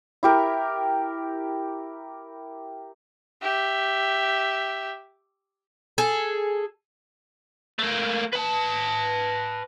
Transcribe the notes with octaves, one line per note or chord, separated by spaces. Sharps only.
E4 G4 A#4
G4 E5
G#4 A4
A3 A#3
B4 A5